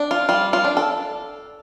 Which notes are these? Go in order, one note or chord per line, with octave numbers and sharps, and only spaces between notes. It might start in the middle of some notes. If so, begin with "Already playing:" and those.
Already playing: D4
F4
G3 F4
F4
D4
A4